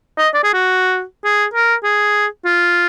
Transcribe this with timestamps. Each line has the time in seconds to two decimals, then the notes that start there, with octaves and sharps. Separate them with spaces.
0.18 D#5
0.34 D5
0.44 G#4
0.53 F#4
1.24 G#4
1.54 A#4
1.84 G#4
2.45 F4